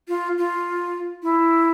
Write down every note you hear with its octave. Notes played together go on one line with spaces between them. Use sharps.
F4
F4
E4